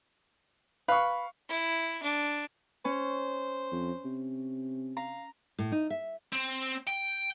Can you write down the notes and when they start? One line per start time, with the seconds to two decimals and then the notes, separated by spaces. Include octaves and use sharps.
0.88 B4 F5 C#6
1.49 E4
2.03 D4
2.85 C#4 C5
3.72 F2
4.05 C3
4.97 F5 A#5
5.59 A2
5.72 D#4
5.90 E5
6.33 C4
6.87 G5